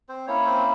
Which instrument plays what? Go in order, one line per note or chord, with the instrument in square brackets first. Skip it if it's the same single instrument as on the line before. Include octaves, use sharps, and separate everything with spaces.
[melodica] C4 C5
A#3 C#4 E4 C#5
C4 C5